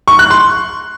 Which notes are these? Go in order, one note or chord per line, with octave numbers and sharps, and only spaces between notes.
C#6
F#6
C6